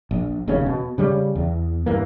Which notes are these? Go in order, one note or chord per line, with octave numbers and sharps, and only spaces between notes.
A#1
F1 D#2 C#3 C#4
B2
C#3 G3 A#3 C#4
E2
G2 E3 A#3